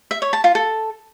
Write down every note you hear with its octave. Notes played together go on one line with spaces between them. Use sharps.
E5
C#5
A5
F4
A4